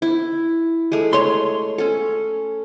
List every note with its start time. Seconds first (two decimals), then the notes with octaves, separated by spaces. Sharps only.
0.02 E4
0.92 G#3 A3
1.13 C#5 C6
1.78 C#4 A4